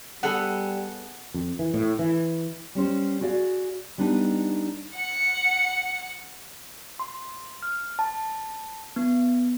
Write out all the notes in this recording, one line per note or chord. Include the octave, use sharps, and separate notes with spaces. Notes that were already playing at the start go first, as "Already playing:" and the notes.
G3 B3 G#4 A4 F#5
F2
E3
A2
E3
G3 C#4 C5
F#4 G#4 D5 F5
G3 B3 D4 D#4
F#5 C#7
C6
F6
A5
B3